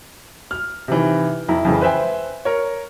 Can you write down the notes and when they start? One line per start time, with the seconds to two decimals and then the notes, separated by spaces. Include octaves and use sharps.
0.51 F6
0.88 C3 D#3 E3
1.48 F2 E4 A#5
1.65 F2 C#3 E3 G#3
1.81 B4 C5 E5 G5 G#5
2.45 A#4 C#5